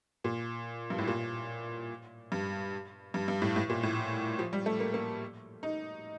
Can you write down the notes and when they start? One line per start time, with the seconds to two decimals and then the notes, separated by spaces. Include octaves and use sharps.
0.24 A#2
0.90 G2
0.98 A2
1.07 A#2
2.32 G2
3.14 G2
3.28 G2
3.42 A2
3.56 A2
3.70 A#2
3.83 A2
4.39 F3
4.53 G3
4.66 A3
4.80 A#3
4.94 A#3
5.63 D#4